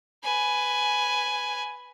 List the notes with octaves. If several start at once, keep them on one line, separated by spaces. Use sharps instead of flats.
B4 G#5